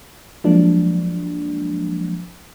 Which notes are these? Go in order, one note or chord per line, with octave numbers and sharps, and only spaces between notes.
F3 F#3 G#3 A#3 D4